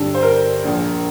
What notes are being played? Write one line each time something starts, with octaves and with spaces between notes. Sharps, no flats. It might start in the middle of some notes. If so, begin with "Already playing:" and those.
Already playing: G1 G2 D3 G3 A4
C5
A#4
A#1 A#2 F3